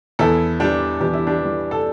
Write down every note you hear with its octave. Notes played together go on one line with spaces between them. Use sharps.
E2 E4 A4
E3 G3 D4 G4
E2 G4
E4
D4 G4
E3 G3
A4